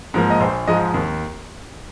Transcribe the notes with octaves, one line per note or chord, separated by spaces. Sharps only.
G#2 F3 A#3
D#5
A#1 C5
G#2 F3 G#3 D#5
D#2